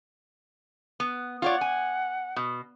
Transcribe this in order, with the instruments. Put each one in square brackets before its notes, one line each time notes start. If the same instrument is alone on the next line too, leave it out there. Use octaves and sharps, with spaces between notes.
[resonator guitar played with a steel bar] B3
[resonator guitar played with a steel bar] F4 C#5 D5 [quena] F#5
[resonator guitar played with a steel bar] G#5
B2